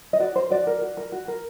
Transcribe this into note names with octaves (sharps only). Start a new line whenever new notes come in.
D#5
F#4 D5
A#4 C5
F#4 D5
A#4
F#4
A#4
F#4
A#4